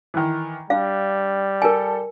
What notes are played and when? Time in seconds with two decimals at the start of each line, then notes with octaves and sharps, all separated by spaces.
0.14 D#3 E3
0.70 G3 D4 F5
1.62 A4 A#4 G#5